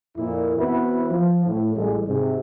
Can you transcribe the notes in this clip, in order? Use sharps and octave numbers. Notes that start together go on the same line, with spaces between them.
F2 A#2 E4
E3 B3 C4 E4 F#4 B4
F3
A2
A1 A2 G3 G#3 A4
G#2 C3